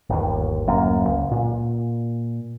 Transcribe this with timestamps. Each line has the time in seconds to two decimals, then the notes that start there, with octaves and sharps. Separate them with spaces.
0.10 G1 D#2
0.67 D1 F#2 A#3
1.07 C#2
1.31 A#2